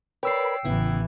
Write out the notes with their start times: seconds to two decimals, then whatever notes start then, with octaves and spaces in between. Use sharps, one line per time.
0.23 A#4 B4 C#5 D5 G5 B5 E6 C7
0.65 A1 C#3 E3 B3 E4